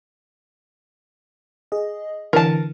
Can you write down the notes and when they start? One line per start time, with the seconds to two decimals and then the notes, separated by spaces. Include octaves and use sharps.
1.72 G#4 D#5
2.33 D3 E3 A#4 A5